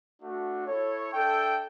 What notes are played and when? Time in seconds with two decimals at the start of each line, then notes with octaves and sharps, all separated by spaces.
0.21 A3 D4 F#4
0.67 E4 A4 C#5
1.12 D4 A4 E5 G5